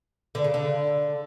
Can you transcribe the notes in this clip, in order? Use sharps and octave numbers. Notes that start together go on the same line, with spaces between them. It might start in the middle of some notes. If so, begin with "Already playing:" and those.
D3
C#3
D3